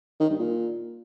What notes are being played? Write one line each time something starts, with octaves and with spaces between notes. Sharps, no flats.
D#3
G2
A#2